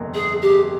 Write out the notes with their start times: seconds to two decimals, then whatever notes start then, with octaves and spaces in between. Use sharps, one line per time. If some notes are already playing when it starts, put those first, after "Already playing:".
Already playing: G1 F2 C3 D#3 A#3
0.15 G#4
0.42 G4